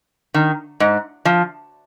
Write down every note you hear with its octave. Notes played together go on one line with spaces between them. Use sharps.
D#3
G#2
F3